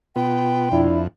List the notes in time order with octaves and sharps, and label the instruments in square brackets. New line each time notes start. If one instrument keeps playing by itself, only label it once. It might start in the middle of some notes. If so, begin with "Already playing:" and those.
[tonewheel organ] B2 F4 C6 [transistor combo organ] B3 [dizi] G5
[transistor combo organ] F2 [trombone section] D4 E4